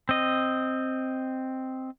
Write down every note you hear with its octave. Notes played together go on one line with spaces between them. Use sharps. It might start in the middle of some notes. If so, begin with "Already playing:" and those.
C4 D#5